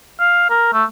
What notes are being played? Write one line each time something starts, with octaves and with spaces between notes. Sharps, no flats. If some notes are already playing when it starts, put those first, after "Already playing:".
F5
A#4
A3